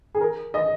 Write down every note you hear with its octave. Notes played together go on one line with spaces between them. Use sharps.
G#4
A#4
D#5